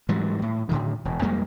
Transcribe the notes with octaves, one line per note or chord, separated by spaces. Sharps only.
G#2 E3 F#3 G3
A2
A2 D3 D#3
E1
F2 G3 G#3 A#3